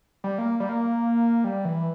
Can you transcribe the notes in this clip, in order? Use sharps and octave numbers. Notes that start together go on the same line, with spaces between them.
G3
A#3
G3
A#3
G3
E3